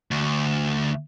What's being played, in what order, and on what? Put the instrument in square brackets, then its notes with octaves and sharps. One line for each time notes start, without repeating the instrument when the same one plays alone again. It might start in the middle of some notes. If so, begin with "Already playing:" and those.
[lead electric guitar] D2